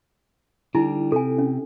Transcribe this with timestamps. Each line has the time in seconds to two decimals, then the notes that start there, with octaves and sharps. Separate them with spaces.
0.75 D3 G3 D#4 E4
1.12 C3 A4 G#5
1.38 C#4